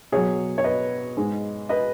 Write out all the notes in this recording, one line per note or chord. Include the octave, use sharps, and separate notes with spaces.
B2 F#3 G#4 C#5
C#5
B4 D#5
G#2 G#3
B4 D#5